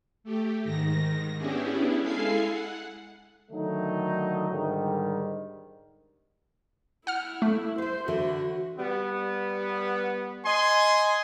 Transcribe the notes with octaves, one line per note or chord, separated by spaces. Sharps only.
A3 G4
G#2 D#3 A#6
B3 C#4 D4 E4 G4 G#4
G#3 E4 A4 F5 G#5 C7
F#5
D3 D#3 F#3 A3 D#4
G#2 D3 D#3 G3
E4 F#5 F6
A3
C5 E5 F5
D3 E3 F#4 C5
G3 B3
D#5 G#5 C6